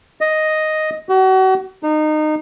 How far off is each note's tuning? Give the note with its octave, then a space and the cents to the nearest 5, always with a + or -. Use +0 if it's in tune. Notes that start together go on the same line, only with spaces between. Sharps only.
D#5 +0
F#4 +35
D#4 -25